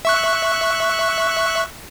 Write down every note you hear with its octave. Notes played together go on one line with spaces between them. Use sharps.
E5 C#6 F#6